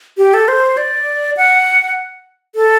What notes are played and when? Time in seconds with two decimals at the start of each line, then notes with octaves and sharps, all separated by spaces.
0.18 G4
0.34 A4
0.48 C5
0.77 D5
1.37 F#5
2.55 A4